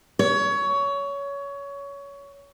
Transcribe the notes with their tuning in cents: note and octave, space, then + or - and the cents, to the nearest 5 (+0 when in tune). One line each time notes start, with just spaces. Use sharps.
C#5 +20